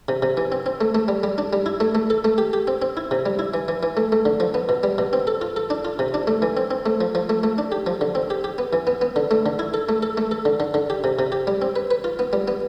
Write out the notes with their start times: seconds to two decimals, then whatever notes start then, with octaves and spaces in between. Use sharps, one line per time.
0.09 C3
0.22 C3
0.37 E3
0.52 C4
0.66 C4
0.81 A3
0.95 A3
1.08 G3
1.23 G3
1.38 D4
1.53 G3
1.66 E4
1.80 A3
1.95 A3
2.10 A4
2.24 A3
2.38 G4
2.53 G4
2.67 C4
2.82 C4
2.97 E4
3.11 C3
3.26 G3
3.39 E4
3.54 E3
3.68 E3
3.83 E3
3.97 A3
4.12 A3
4.25 D3
4.40 F3
4.54 B3
4.69 B2
4.83 G3
4.98 B2
5.13 C4
5.27 A4
5.41 F4
5.56 A4
5.70 D4
5.85 F4
5.99 C3
6.14 D4
6.27 A3
6.42 E3
6.57 C4
6.71 C4
6.86 A3
7.01 F3
7.15 F3
7.29 A3
7.43 A3
7.58 D4
7.72 G4
7.86 F3
8.01 D3
8.15 C4
8.30 G4
8.44 G4
8.58 B3
8.73 E3
8.87 B3
9.01 B3
9.16 D3
9.31 A3
9.46 D3
9.59 E4
9.74 A4
9.89 A3
10.03 A4
10.17 A3
10.31 A4
10.45 D3
10.60 D3
10.74 D3
10.90 G4
11.04 C3
11.19 C3
11.32 G4
11.47 G3
11.62 C4
11.76 B4
11.91 B4
12.04 F4
12.19 B3
12.33 G3
12.48 B3